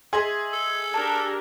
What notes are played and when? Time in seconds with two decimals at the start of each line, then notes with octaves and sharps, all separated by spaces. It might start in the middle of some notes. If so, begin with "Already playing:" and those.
0.13 G#4 D#5 E5 C6
0.53 A4
0.94 D4 G4 A#4 A5